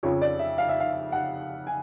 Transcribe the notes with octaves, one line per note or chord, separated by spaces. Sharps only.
F2 C#3 F3 C#5
D5
E5
F5
E5
F5
F#5
G#5